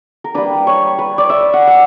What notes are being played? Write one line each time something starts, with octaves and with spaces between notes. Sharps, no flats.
A#4
G3 A#3 D4 B4
C#5
B4
D5
E5
F#5
F#5